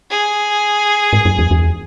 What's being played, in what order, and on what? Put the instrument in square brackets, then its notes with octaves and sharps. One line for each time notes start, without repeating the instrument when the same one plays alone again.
[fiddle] G#4
[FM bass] G#2
F#2
E2
E2